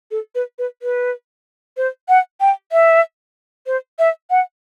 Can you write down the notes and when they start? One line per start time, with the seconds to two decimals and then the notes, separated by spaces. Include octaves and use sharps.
0.11 A4
0.35 B4
0.59 B4
0.82 B4
1.77 C5
2.09 F#5
2.40 G5
2.72 E5
3.66 C5
3.99 E5
4.30 F#5